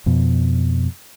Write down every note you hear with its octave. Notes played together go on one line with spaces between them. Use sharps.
F2 B2